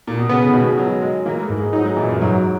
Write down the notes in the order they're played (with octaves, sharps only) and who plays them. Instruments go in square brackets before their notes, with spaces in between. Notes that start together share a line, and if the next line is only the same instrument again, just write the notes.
[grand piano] A#2
B2
[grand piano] C#3 [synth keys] B3
[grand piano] C#3
D#3
[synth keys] B2
[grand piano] G#3
[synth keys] B2 [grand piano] F#3
[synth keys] G#3
[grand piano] E3 [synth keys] A#3
[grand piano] G#3
[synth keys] G#2
[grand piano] G#3
[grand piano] F#3 [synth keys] D#4
[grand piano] G#3
[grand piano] A#2 [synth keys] E3
[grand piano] F#2
[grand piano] G#2 [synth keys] F#3